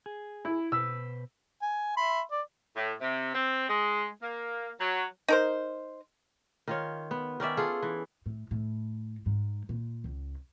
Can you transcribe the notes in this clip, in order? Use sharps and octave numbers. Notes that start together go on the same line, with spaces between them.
G#4
E4
B2 B4 C5 E6
G#5
E5 B5 C6
D5
A2
C3
C4
G#3
A#3
F#3
D#4 A#4 C5
D#3 F4 C#5
B3
D#3 C#4 D5 E5
F4 G#4 A4
E3
A2
A2
G#2
A#2
C#2